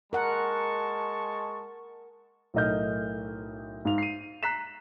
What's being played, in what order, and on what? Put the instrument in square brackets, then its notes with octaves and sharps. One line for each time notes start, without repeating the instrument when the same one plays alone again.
[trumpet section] G#3 A5 C#6 [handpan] A#4 F#5
[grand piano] B1 A2 A#4 D#5 F6 G6
G#2 F5 F7
C7 D#7
A#5 F#6 B6 C7 E7